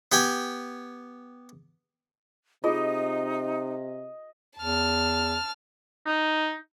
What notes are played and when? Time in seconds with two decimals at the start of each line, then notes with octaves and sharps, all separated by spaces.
0.12 B3 G4 G5 G#5
2.64 C3 D#4 F4 G#4 D#5
4.59 E2 A5 F6
6.06 D#4